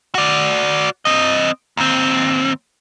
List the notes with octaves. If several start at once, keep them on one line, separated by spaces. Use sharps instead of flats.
F#4 D5
C4 D#5
D#2 C4